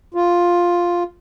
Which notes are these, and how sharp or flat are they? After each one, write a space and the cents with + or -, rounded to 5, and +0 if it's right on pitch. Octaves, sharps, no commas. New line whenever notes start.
F4 +5